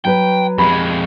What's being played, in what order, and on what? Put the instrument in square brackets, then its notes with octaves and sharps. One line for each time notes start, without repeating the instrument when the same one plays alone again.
[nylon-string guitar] F#3 B4 [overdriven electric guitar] G5
[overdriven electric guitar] F2 G#3 [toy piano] G4 B5